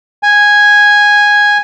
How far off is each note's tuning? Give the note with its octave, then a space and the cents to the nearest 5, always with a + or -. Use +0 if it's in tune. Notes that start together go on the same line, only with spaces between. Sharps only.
G#5 -5